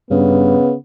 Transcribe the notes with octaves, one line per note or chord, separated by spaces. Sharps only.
G2 C#3 B3